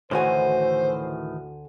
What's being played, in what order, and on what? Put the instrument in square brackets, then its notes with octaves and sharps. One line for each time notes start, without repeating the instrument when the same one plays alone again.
[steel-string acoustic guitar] D2 F#4 G#5 [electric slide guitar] A2 D#3 E3 [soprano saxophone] C5